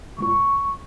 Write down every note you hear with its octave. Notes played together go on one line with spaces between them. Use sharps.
G1 C#2 A#2 C#6